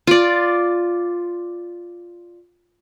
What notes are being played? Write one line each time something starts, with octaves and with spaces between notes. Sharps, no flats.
F4 D5